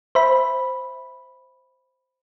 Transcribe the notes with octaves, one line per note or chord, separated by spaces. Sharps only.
C5 E5 B5